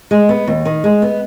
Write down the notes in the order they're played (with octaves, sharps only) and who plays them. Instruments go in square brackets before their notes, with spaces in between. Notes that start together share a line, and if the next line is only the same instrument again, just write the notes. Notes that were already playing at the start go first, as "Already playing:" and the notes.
[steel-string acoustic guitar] G#3
B3
D#2
D#3
G#3
B3